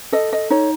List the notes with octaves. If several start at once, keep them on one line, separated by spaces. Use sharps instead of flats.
A4 D#5
D#5
D#4 C#5